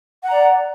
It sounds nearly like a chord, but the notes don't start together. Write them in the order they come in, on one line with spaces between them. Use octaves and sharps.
F#5 A#5 D5